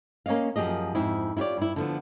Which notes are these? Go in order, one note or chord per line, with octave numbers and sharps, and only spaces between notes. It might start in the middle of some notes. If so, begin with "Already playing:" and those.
A#3 C#4 C#5 D#5 F5
F#2 F3 G4 G#4 D#5
F2 G#2 E4
E4 F4 G4 C#5 D5
G2 E4
D3 F3 B3